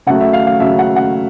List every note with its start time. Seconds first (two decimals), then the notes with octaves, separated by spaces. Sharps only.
0.07 C#3 F#3 A3 F#5
0.20 E5
0.33 F5
0.47 F5
0.60 C#3 F#3 A3 E5
0.79 F#5
0.96 F#5